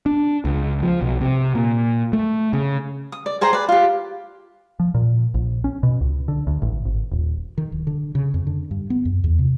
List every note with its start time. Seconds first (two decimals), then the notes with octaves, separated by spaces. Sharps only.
0.06 D4
0.45 C#2
0.82 F3
1.01 B1
1.21 C3
1.55 A#2
2.13 A3
2.53 C#3
3.12 D#6
3.26 D5
3.41 G#4 C5 G5 A#5
3.53 B4 D5
3.69 F4 G4
4.80 F3
4.95 A#2
5.34 A#1
5.64 C#4
5.83 B2
6.01 C#2
6.28 D3
6.47 D2
6.62 A1
6.85 G#1
7.12 D#1
7.58 D#3
7.72 D1
7.87 D3
8.15 C#3
8.34 F2
8.47 D3
8.71 G2
8.90 B3
9.05 F#2
9.24 E2
9.39 C3